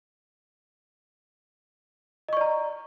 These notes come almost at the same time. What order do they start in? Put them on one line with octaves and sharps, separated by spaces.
D#5 C#6 D5 A#5